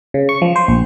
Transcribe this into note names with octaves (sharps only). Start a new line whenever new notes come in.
C#3
C#6
F3
C5
A#1